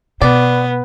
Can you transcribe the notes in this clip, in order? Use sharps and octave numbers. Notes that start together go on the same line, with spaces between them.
B2 B3 D5